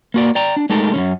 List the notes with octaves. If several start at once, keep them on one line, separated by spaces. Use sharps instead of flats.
A#3 F#4 D5
D5 G5 A#5
D4
G#3 A3 D#4 G4 A4 A#4
F#2 E3 C#4